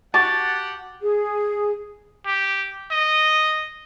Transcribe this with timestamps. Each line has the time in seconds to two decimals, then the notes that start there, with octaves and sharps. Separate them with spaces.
0.14 F#4 G4 F#5 A5 C#6 D6 A6
1.02 G#4
2.26 G4
2.92 D#5